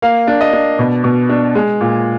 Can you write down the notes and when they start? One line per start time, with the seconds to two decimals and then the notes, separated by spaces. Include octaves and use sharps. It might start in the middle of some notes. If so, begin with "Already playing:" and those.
0.02 A#3 F5
0.27 D4
0.41 D#5
0.53 D4
0.79 B2
1.04 B2
1.29 D4
1.55 G#3
1.81 A#2